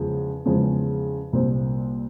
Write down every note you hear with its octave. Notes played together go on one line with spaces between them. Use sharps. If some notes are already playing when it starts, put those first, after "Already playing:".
Already playing: E2 C#3 F3 G#3
E2 C#3 F3 G#3
C2 A#2 G3 C4